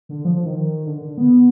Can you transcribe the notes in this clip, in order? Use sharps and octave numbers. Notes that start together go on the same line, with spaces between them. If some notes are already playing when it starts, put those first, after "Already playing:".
D3
F3
F3
D#3
D3
D3
B3